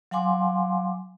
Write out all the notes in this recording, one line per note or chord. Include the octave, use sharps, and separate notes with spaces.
F#3 F5 F#5 G#5 C6 D6